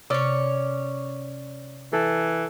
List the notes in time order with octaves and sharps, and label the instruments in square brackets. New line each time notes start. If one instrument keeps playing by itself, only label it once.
[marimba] C3 [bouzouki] C#4 C#5 [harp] D5
[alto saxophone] E3 [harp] A4